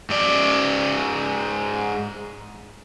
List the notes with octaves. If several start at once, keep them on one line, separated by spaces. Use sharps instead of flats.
G#2 D5